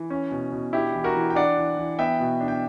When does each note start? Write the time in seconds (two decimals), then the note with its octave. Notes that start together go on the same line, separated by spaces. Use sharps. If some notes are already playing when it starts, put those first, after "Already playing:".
Already playing: E3
0.10 C#4
0.31 B2
0.52 B2
0.73 D4 E4 G4
0.94 E3
1.04 F#4 A#4
1.16 E3
1.30 G5
1.35 D4 D5 F#5
1.57 E3
1.77 E3
1.99 B3 E5 G5
2.20 B2
2.41 D4
2.48 G5